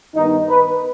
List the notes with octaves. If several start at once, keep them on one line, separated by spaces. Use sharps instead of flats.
G2 D#3 B3 D#4
B4